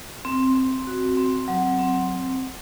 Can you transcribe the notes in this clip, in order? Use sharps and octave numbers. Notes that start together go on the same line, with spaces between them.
C4
C4
F#4
C4
F#3
C4